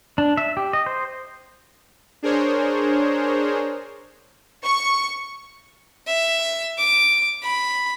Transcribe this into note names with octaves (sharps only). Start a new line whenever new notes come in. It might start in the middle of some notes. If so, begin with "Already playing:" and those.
D4
E5
G4
D#5
C5
D4 G#4 A#4 C5 C#5
C#6
E5
D6
B5